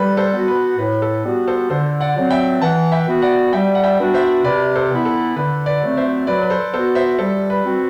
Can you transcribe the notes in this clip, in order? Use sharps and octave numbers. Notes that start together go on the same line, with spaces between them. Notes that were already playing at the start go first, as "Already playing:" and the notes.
Already playing: G3 A4 B4
A4 C5
B3 F#4
B4
A2 B4
A4
G3 B3 F#4
A4 C5
D3 A4 C5
D5 F#5
F#3 C4
E5 G5
E3 F#5 A5
E5 G5
B3 F#4
D5 F#5
G3 E5 G5
F#5
E5 G5
B3 D4 F#4
C5 E5
C3 B4 D5
A4 C5
E3 B3 E4
A4
D3 B4
B4 D5
F#3 A3 C4
C5 E5
F#3 B4 D5
B4
A4 C5
B3 F#4 A4 C5
C5 E5
G3 A4 C5
B4
C4 F#4